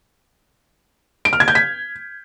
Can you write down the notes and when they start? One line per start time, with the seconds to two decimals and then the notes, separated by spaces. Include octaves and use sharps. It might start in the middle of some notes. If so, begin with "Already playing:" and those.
1.25 D7
1.33 F6
1.40 G#6
1.48 G6
1.55 B6